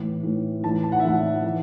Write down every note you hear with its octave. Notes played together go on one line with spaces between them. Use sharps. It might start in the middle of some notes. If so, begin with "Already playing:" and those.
Already playing: A2 E3
A2 E3
A2 E3 A5
A5
F#5
E5
A2 E3 F#5
E3